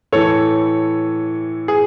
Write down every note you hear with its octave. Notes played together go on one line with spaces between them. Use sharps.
A2 E3 A4 C#5
G#4